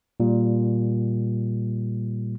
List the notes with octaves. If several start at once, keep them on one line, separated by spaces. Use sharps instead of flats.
A#2 G3